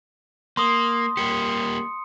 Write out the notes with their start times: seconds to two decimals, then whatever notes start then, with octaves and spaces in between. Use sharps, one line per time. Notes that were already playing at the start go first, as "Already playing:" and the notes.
0.57 A#3 C6 D#6
1.17 G3 A#3 G4 C#7